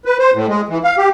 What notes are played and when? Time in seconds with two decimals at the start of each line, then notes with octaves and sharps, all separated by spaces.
0.05 B4
0.19 C5
0.34 A2
0.48 G#3
0.69 E3
0.84 F5
0.98 G4